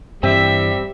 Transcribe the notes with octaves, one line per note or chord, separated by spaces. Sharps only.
G2 E3 G3 C4 E5